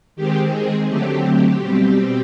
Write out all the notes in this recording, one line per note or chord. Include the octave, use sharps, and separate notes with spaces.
D#3 G#3 C4 G4
G#4
D3 F#3 A3 C4 G4
B2 G3 C4